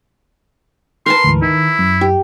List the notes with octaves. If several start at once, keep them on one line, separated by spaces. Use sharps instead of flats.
A#4 B4 A5 C6
D2 G#2 E3
D#3 E4
F#2
G4